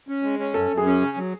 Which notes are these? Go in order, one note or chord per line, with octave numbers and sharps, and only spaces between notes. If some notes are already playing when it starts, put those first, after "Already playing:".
C#4
G#3
C#4
F#2 A4
F#2
G#4
C#4
C#3
F#3